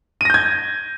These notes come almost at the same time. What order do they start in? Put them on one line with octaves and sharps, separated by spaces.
D#7 A#6 G6 G#6